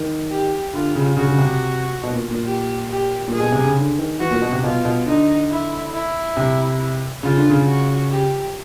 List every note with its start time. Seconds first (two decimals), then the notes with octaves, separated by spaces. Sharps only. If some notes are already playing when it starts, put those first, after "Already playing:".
Already playing: D#3
0.31 G4
0.73 D3 F4
0.95 C#3
1.17 C#3 F#4
1.28 C#3
1.38 C3
2.03 B2
2.12 A#2
2.31 A#2
2.46 G4
2.90 G4
3.28 A#2
3.33 G#4
3.40 B2
3.52 C3
3.64 C#3
3.77 D3
3.98 D#3
4.19 E3 F#4
4.31 A#2
4.42 B2
4.52 C3
4.63 B2 F4
4.85 B2
5.06 D3 D#4
5.50 E4
5.94 E4
6.37 C3
7.23 C#3 F4
7.37 D3
7.50 C#3
7.66 F#4
8.10 G4